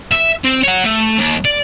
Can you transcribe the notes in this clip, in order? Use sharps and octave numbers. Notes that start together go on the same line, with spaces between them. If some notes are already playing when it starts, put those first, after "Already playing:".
E5
C4
C#5 F#5
A3
D#2
D5